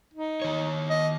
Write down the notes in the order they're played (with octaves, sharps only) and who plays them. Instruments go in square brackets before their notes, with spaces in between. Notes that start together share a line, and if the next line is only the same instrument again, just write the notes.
[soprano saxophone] D#4
[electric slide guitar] D#3 C#5
[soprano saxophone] D#5